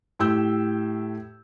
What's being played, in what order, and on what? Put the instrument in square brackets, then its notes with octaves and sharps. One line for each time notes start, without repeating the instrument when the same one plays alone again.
[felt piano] A2 G4 E6 G6